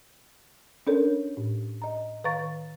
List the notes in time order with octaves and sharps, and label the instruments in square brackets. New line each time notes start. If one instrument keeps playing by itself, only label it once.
[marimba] C#4 D4 A4 A#4 C#5
A2
D#5 A#5
D#3 B4 F5 A#5 C#6 A6